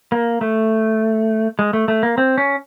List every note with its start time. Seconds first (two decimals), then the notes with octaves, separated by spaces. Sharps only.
0.12 A#3
0.41 A3
1.59 G#3
1.73 A3
1.88 A3
2.03 A#3
2.18 C4
2.38 C#4